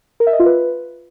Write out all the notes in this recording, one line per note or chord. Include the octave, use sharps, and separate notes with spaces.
A#4
E5
D#5
F4
B4